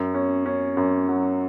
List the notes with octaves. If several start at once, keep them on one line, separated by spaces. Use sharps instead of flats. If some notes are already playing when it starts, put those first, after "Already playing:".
Already playing: F#2
C#4
C#4
F#2
F#3